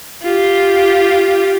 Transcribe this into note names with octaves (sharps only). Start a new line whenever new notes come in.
F4 G4